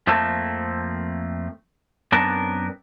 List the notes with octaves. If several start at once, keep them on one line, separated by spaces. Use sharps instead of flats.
F2 F3 A3 A#3 C4 A5
F#2 B3 C4 D4 A#4 A5